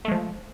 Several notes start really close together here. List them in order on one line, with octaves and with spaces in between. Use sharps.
A3 G#3 F3